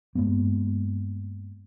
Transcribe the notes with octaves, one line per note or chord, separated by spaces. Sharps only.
G2 G#3 A#3 B3